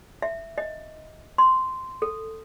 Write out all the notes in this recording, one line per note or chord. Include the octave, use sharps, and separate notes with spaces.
E5
D#5
C6
A4